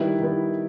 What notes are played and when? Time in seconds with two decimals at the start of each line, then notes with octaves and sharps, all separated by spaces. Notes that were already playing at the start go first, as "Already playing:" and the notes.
Already playing: D#3 G3 B3 E4
0.20 D#3 G3 B3 E4